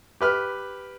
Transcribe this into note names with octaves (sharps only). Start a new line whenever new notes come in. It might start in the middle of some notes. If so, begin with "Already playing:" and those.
G4 B4 F6